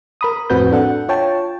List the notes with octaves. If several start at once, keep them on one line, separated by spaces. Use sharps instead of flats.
A#4 B5 D#6
F2 A2 C4 F#4 B4 G6
D4 A4 F#5
F4 C#5 G5 A5